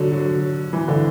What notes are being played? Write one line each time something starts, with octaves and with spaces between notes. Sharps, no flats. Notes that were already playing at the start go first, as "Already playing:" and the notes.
Already playing: D3 F#3
F#3
E3
D3